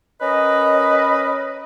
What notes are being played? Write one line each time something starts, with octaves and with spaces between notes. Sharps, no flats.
C#4 A#4 B4 D#5